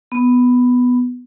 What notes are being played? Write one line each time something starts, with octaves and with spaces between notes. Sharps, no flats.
B3